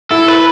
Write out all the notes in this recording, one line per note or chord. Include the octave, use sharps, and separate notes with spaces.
E4 A4
B4